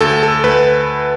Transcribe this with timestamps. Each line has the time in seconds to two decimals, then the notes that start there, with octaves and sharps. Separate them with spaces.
0.01 D2 A4
0.23 A4
0.44 D2 B4